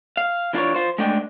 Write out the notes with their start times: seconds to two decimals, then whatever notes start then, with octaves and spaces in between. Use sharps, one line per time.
0.17 F5
0.53 E3 D4 F4 A4 A#4 C#5
0.75 F4 C5
0.98 G#3 A3 D4 D#5 G5